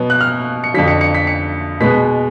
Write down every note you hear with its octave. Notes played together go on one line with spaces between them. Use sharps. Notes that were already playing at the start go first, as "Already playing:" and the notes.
Already playing: B2 F#3 B3
F#6
F6
C#7
F2 D3 F#3 B6
C#7
C#7
B6
C#7
B2 G#3 B3 B6